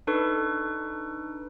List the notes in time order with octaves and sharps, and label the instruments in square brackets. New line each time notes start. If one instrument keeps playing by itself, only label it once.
[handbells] D4 D#4 A4 B4 C#6